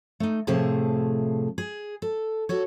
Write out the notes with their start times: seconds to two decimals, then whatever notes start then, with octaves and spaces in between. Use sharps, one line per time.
0.20 A3 D#4
0.47 A2 C3 F3 A3 G#4 A5
1.58 G#4
2.02 A4
2.49 F#4 A4 C#5